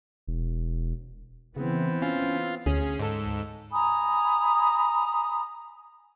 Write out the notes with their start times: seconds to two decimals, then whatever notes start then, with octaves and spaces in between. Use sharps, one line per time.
0.27 E1
1.56 C#3 E3 B3 C4
2.02 C#4 F4
2.66 D2 C#4 G#4
2.99 G#2 A4
3.72 G#5 A#5 B5 D#6